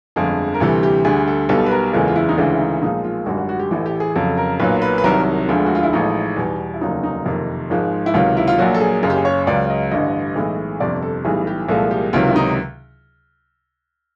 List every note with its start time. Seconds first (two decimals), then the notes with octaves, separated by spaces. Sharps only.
0.16 G1 F2 D3 F3 G#3 G#4
0.54 A#4
0.60 D2 C3 E3 G3 A4
0.83 G4
1.05 D2 D3 G3 G#4
1.27 A4
1.49 B1 B2 G3 A4
1.66 B4
1.71 A#4
1.93 F#1 E2 C#3 E3 G#3 A4
2.08 F4
2.16 E4
2.29 D#4
2.38 D2 C#3 E3 G#3 D4
2.52 E4
2.60 D#4
2.82 B1 A#2 F3 G#3 D#4
3.04 F4
3.26 G#1 F#2 D3 G3 F#4
3.38 F#4
3.49 F#4
3.59 G4
3.71 A1 A2 E3 G4
3.86 G4
4.00 G#4
4.15 F2 C#3 F#3 A4
4.38 A#4
4.59 B1 A#2 F#3 B4
4.82 B4
4.98 B4
5.04 C2 C3 D#3 F#3 A#4
5.48 E1 D2 D3 F3 G#3
5.66 F#4
5.75 F4
5.83 E4
5.93 A1 A2 F3 G#3 D#4
6.37 E2 B2 G3
6.74 E4
6.81 F1 D#2 C#3 F#3 D#4
7.03 D#4
7.25 F#1 F2 C3 D#3
7.70 G#1 G#2 F3 G#3
8.06 E4
8.14 C#2 C3 D#3 F#3 F4
8.37 E4
8.48 F4
8.58 A#1 A#2 F#3 F#4
8.74 A4
8.80 G#4
9.03 F#1 F#2 C#3 G#4
9.10 G4
9.17 G#4
9.25 C#5
9.47 C#2 C#3 F#3 D5
9.70 D#5
9.91 A1 G2 D3 G3 D#5
10.36 B1 A2 E3 G#3
10.80 G1 F2 C3 D5
11.02 A4
11.25 B1 A2 E3 G3 G#4
11.47 G4
11.69 C2 A#2 F3 G#3 A4
11.91 G4
12.13 C#2 C3 D#3 F#3 F4
12.28 E4
12.36 D#4